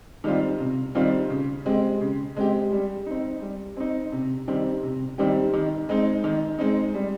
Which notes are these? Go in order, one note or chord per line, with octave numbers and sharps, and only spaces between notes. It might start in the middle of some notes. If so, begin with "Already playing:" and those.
D#3 G3 C4 F4
C3
D#3 G3 C4 F4
C#3
G#3 C4 G4
C#3
G#3 C4 G4
G3
C4 D#4
G3
C4 D#4
C3
D#3 G3 C4 G4
C3
D#3 G3 C4 G4
D#3
G#3 C4 D#4
D#3
G#3 C4 D#4
G3